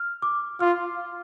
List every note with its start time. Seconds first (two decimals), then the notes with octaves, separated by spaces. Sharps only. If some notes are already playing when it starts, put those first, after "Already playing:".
Already playing: F6
0.22 D6
0.60 F4 F6